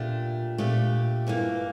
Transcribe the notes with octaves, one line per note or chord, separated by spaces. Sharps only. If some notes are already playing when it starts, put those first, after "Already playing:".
Already playing: A#2 A3 D4 G4
A#2 A3 D4 G4
G2 E3 A#3